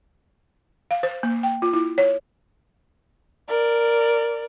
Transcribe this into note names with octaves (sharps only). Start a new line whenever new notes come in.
F5
C5
A#3
G5
F4
E4
C#5
A#4 D5